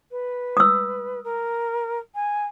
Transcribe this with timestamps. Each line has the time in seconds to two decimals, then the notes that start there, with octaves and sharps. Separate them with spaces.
0.11 B4
0.57 D#6 E6
1.24 A#4
2.15 G#5